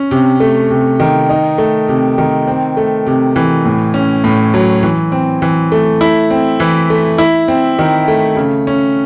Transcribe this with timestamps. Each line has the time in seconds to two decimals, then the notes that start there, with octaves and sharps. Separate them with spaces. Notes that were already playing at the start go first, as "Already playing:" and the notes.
Already playing: C#4
0.11 C3
0.40 A3
0.70 C3
1.00 D#3
1.30 D#4
1.58 A3
1.88 C3
2.18 D#3
2.47 C4
2.77 A3
3.07 C3
3.36 E3
3.66 A2
3.94 C#4
4.24 A2
4.54 F#3
4.83 E3
5.12 C4
5.42 E3
5.72 A3
6.01 E4
6.30 C4
6.60 E3
6.90 A3
7.18 E4
7.48 C4
7.79 D#3
8.08 A3
8.36 C#3
8.67 C#4